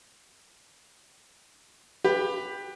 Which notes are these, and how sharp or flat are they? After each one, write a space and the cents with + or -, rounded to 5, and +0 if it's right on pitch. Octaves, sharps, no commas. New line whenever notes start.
G4 +20 B4 +0